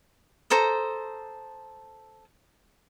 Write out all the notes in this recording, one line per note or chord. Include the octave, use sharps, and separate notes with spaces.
A4 C5 A#5 D#6